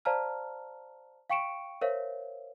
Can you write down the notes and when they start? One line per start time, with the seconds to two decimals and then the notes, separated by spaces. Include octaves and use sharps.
0.05 C5 D5 F5 A5 A#5 F6
1.30 F5 G5 C#6 C#7 D7 E7
1.81 A#4 C5 C#5 E5 F5